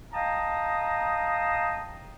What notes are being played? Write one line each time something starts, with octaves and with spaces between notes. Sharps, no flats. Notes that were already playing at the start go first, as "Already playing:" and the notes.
D#5 F5 G5 A5 A#5 D#6